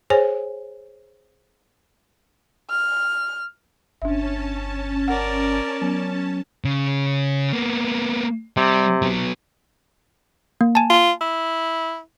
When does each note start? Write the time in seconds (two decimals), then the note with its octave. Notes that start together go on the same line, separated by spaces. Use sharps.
0.10 G#4 C5 C#5 G#5
2.70 F6
4.02 G1 C#4 D4 E5 A5
5.08 A#4 D5 F#5
5.81 F#3 B3
6.65 C#3
7.53 A#3 B3
8.57 C3 G3
9.02 F#3 B3
10.61 A#3
10.75 G#5 A5
10.90 F4
11.21 E4